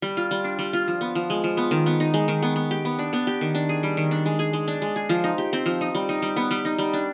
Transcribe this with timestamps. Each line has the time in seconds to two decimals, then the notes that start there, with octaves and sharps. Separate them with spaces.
0.02 G3
0.17 F4
0.31 G3
0.44 D4
0.59 G3
0.73 F4
0.88 F3
1.01 B3
1.15 F3
1.30 G#3
1.44 F3
1.57 B3
1.71 D#3
1.86 B3
2.00 D#4
2.14 G#3
2.28 D#3
2.43 B3
2.56 B3
2.71 G4
2.85 B3
2.99 D4
3.13 B3
3.27 G4
3.41 D#3
3.55 D4
3.69 G#4
3.83 G3
3.97 D#3
4.11 D4
4.26 G#3
4.39 G#4
4.53 G#3
4.68 D4
4.82 G#3
4.96 G#4
5.09 F3
5.24 D#4
5.38 G4
5.53 C4
5.66 F3
5.81 D#4
5.95 G3
6.09 D#4
6.22 G3
6.36 B3
6.51 G3
6.65 D#4
6.79 G3
6.94 D4